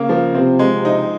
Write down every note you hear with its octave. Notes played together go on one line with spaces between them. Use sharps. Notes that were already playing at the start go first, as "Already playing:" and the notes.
Already playing: C#3 A#3
F3
C3 C4
G#3
C3
D#4